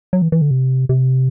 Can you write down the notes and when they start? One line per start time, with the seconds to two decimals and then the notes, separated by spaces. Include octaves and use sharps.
0.13 F#3
0.22 E3
0.32 E3
0.41 D3
0.51 C3
0.89 C3